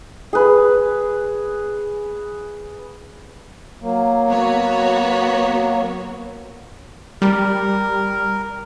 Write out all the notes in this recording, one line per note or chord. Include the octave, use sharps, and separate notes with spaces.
G#4 B4
F#3 A#3
B3 F#4 C#5
G3 A#4